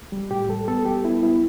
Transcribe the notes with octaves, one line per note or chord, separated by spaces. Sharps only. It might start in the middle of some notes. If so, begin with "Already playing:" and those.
G3
A2 G4
G3 A4
B3 A4
G3 G4
B3 E4
B3 E4